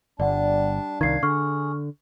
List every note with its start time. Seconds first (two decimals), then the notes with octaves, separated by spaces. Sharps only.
0.20 G1 G3 D4 D5 F#5 A5
1.01 C2 D#3 D4 F5 G#6 C7
1.23 D3 G#4 C#6 F6